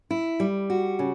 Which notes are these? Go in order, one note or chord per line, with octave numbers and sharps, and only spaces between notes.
E4
G3
F#4
C#3